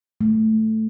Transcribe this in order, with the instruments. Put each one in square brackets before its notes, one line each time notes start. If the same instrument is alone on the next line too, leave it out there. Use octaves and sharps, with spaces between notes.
[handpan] A3